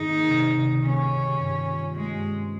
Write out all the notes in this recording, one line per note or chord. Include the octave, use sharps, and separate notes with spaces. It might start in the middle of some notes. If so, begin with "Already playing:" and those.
Already playing: G#2 D#3 C4 D#4
A#3
C3
D#3
C#2
A#3 C#4
D#3
G3
G2
F4
G3
G#3 C#4
G2
C4